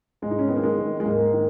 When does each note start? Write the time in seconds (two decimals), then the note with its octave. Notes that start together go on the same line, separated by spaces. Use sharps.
0.22 G#2 G#3
0.31 D#4
0.39 C#4
0.48 D#3 B3
0.56 A#3
0.63 G#3
0.78 D#3
1.00 G#3
1.05 G#2 A#3
1.33 D#3